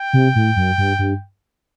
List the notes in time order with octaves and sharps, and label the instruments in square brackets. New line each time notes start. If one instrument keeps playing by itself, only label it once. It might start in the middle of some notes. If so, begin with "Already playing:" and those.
Already playing: [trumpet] G5
[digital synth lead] C3
A2
F#2
G2
G2